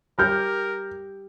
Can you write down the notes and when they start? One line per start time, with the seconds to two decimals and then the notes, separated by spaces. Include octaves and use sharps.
0.19 G3 G4 A#4 F6 G6